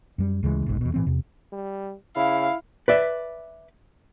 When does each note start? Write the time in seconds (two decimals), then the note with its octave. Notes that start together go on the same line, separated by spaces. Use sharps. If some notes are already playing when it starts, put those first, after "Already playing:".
0.18 F#2 G3
0.43 D2 C#3 E3 G#3
0.66 F1 B1 G#2
0.81 E2 B2
0.94 A2 E3 C4
1.06 E2 C3
1.52 G3
2.16 C#3 E4 F5
2.88 B4 D5 E5